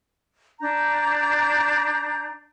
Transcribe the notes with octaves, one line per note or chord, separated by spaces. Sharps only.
D4 A#5 G6